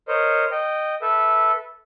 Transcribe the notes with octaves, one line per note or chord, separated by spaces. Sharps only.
A#4 C5 C#5 D#5
D#5 G5
A4 B4 E5